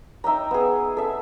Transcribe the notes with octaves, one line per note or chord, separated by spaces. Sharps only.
D#4 E5 G5 A#5
B3 G#4
A4 E5